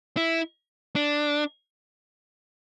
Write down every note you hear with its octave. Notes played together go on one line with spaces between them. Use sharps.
E4
D4